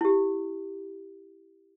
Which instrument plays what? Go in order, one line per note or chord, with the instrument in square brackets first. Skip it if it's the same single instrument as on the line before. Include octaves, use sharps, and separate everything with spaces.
[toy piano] E4 G4